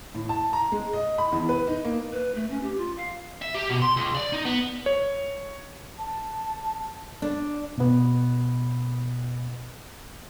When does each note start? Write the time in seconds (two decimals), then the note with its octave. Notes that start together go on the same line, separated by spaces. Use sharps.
0.15 A2
0.29 A5
0.53 A#5
0.72 G#3
0.93 D#5
1.18 B5
1.32 E2
1.49 B4
1.67 D#4
1.85 A#3
2.12 B4
2.35 A3
2.50 C#4
2.63 G4
2.78 F4
2.96 F5
3.42 E5
3.54 G4
3.69 B2
3.82 C6
3.96 C#2
4.15 D5
4.33 D#4
4.45 B3
4.86 C#5
5.98 A5
7.22 D4
7.77 B2 B3